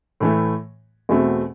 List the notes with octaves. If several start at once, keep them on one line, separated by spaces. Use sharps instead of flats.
A2 E3 A3
E2 B2 A3 C4